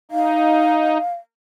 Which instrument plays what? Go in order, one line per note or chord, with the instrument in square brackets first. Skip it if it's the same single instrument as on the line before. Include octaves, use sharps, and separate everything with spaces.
[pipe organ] D#4 [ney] F5